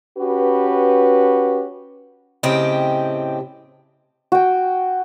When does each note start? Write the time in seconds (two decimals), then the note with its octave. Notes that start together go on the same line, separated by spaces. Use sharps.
0.18 C#4 F#4 G4 B4
2.43 A2 C#3 C4 G4 D#5 G5
4.32 F#4 G5